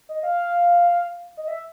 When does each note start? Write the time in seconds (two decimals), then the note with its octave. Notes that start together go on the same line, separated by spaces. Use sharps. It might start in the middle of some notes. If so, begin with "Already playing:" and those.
0.09 D#5
0.23 F5
1.37 D#5
1.48 E5